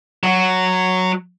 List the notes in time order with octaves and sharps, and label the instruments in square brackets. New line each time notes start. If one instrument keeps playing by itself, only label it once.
[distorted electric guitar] F#3